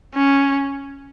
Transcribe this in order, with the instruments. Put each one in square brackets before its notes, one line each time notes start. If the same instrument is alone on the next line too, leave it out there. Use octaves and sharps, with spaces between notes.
[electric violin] C#4